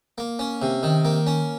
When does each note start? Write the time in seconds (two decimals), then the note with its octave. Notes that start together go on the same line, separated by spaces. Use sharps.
0.18 A#3
0.39 C#4
0.62 C3
0.83 D#3
1.05 A#3
1.27 C#4